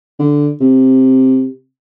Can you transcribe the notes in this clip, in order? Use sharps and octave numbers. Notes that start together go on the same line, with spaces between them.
D3
C3